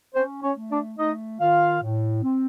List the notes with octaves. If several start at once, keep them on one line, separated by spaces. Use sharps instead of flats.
C4 C#4 C5
C#4 C#5
A3
D4 D5
A3 D#4 D#5
D#3 F4 F5
A2
C4